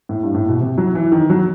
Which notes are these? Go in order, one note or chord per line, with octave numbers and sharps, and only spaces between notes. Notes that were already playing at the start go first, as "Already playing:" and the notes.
A2
G2
A2
B2
C3
F#3
E3
D#3
F#3